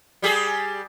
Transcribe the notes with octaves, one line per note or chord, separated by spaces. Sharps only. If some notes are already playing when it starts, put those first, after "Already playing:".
G3 G4 G#4